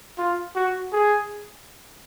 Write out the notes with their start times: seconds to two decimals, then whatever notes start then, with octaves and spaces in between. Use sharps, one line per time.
0.18 F4
0.56 F#4
0.92 G#4